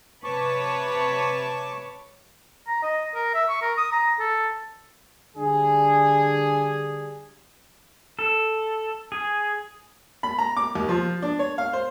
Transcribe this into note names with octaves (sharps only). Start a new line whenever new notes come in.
C3 B4 C#5 A5 C#6 D6
A#5
D#5
A#4
E5
C#6
A#4
D#6
A#5
A4
D3 G3 D4 G#4
A4
G#4
B5
A#5
D6
D#2
F3
D4
C#5
F5
C5